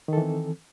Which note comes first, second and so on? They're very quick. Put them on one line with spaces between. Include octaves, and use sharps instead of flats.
D#3 A4 E3 C4